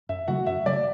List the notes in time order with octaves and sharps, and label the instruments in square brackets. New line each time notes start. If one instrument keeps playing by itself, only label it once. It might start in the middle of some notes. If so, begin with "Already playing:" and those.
[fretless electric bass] F#2 [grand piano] E5
[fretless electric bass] C#3 F#3 A3 [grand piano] F#4 F#5
[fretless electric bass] F#2 [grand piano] E5
[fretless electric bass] C#3 F#3 A3 [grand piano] D5